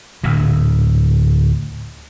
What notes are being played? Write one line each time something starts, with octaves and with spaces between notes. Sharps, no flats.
D1 D2 A#2